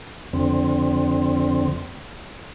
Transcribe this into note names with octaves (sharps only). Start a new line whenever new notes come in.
F2 D3 C4